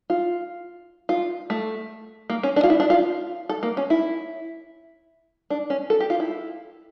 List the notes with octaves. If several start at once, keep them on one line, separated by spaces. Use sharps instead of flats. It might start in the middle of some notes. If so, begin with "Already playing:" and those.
F4
F4
A3
A#3
C#4
D4
F4
E4
D4
F4
A4
A#3
C#4
E4
D4
C#4
A4
G4
F4
E4